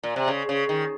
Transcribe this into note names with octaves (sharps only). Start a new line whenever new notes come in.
A#2
C3
C#3
C#3
D#3